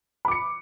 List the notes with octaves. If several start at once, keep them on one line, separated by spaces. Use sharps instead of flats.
B5 D6 C#7